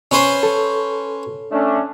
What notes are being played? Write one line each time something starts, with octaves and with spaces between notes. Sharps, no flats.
C#4 B4 C5
A4
A3 C#4 D4